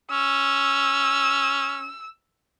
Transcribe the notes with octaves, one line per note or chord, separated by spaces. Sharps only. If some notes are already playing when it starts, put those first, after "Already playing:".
C#4 E6